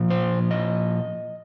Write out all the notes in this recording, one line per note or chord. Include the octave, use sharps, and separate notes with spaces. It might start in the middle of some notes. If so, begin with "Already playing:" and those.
Already playing: A#2 F3
C5
D#5